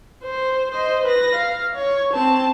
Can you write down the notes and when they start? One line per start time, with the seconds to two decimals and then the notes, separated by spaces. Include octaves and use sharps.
0.24 C5
0.72 C5 D#5
1.05 B4 A#6
1.35 F5
1.76 C#5
2.14 C4 A5